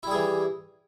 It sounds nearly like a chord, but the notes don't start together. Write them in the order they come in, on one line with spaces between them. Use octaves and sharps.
E4 G3 G#4 E3